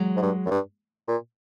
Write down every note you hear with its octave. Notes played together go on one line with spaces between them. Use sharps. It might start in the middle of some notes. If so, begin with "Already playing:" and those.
Already playing: F#3 G#3
G#2
G2
F#2
G2
A#2